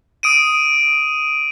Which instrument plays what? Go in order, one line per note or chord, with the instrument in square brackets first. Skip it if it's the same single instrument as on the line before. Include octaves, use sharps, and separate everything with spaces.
[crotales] D#6 D7 D#7